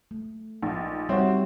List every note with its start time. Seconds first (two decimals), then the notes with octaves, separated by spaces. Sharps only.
0.11 A3
0.63 A#1 D#4
1.09 G3 C4 F#4 C#5 E5